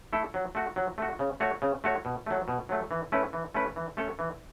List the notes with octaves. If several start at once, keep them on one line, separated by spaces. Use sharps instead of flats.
A3 E4 A4
F#3
A3 F#4
F#3
A3 F#4
C#3
A3 F#4 C#5
C#3
A3 F#4 C#5
B2
F#3 A3
B2
F#3 A3
E3
A3 C#4 E4 B4
E3
A3 C#4 E4 B4
E3
A3 C#4 A4 C#5
E3